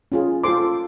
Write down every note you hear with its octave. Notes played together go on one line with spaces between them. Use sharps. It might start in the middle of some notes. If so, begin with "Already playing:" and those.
C#4 F4 G#4
F4 A4 C5 C6 D6